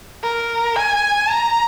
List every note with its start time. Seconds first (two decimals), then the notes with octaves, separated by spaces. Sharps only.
0.23 A#4
0.76 G#5
1.30 A#5